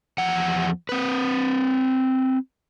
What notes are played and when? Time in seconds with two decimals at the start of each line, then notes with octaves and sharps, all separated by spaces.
0.18 E2 F3 F#5
0.89 C4 B4